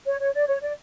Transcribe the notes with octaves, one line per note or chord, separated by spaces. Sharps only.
C#5
C#5
D5
C#5
D5